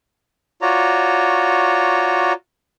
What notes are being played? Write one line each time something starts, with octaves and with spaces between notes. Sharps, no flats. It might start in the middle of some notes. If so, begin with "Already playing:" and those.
F4 F#4 C#5 D5 A#5